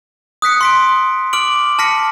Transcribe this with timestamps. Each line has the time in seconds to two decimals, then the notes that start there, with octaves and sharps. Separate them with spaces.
0.42 D#6 F#6 B6 C#7
0.61 C6 B6 D7
1.33 D6 F6 D7 F#7
1.79 A5 F6 A#6 B6 C#7